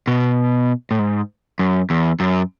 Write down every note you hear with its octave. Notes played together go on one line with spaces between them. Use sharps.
B2
A2
G#2
F#2
E2
F#2